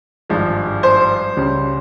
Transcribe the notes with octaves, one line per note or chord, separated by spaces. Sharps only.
G#1 G2 F3 G#3
C5
C#2 C#3 G3